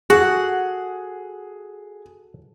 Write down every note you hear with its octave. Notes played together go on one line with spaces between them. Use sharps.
F#4 G#4 A4 F#5